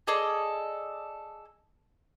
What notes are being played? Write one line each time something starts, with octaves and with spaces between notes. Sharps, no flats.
G#4 A4 D5 D#5